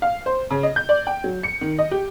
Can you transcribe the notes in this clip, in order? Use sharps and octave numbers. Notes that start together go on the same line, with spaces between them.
F5
C5
C#3
D#5
G6
D5
G5
F#3
C#7
D#3
D#5
G4